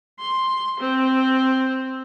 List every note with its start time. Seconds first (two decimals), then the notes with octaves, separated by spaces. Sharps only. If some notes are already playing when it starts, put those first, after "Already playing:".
0.19 C6
0.80 C4